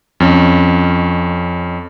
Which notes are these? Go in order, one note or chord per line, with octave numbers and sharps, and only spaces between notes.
F2 C#4